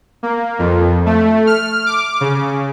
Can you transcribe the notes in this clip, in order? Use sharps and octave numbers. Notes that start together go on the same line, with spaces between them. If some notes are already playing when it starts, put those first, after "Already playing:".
A#3
F2
A3
F6
D6
C#3